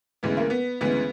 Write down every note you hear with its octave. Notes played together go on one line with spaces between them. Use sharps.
D2 C#3 E3 G#3 B3
A#3
B3
D2 C#3 E3 G#3 B3